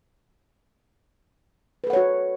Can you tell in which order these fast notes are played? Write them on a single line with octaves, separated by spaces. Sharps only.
B4 A4 F#5 C#5 F#4